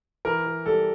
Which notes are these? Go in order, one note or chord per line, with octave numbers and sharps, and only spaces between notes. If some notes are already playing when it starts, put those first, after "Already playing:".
E3 A#4
E3
G3 A4